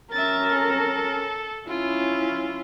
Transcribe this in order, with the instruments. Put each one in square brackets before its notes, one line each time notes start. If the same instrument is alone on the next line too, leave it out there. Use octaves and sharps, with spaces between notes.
[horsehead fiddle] C#4 A#4 [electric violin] E5 A6
[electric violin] A4
[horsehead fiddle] C#4 E4 [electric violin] F4